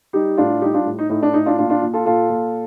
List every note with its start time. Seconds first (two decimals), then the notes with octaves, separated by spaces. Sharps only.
0.13 G3 D#4 G4
0.37 A2 D4 F4
0.61 G3 D#4 G4
0.74 D4 F4
0.85 A2
0.99 D#4
1.09 A2 D#4
1.23 D4
1.34 A2 D#4
1.46 D4 F4
1.58 A#2 D4 F4
1.69 D4 F4
1.82 A#2
1.93 F4 A4
2.05 A#2 F4 A4
2.30 A#2